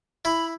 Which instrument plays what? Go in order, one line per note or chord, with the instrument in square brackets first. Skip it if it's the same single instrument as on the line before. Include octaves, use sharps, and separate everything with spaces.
[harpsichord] E4 [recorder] B5